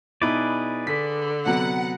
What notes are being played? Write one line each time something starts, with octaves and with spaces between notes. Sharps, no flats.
B2 D#4 E4 G#4 B4 D5
D3 B6
C3 F#3 B3 F#5